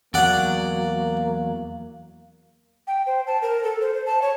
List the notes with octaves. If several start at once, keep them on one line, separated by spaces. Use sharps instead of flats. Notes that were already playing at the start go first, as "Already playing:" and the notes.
E2 F#3 A#3 D5 F#5
G5
C5
A5
A#4
A4
C5
C5
A5
C#5